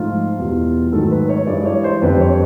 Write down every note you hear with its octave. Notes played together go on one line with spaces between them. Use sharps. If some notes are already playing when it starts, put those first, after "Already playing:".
Already playing: G#2 F3 A3 F4
E2 B2 G3
G#2 D#3 F#3 A3 A4
B4
C#5
G2 E3 G#3 D5
C#5
C5
F2 D3 G3 B4
C#5